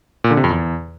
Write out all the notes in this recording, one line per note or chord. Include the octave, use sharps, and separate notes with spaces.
A#2
D3
C3
F2
E2